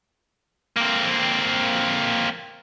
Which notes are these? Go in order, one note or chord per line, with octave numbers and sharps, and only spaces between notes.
A#3 C4